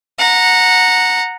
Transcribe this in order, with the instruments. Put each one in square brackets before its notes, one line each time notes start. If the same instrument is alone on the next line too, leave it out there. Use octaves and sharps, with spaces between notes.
[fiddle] F#5 A#5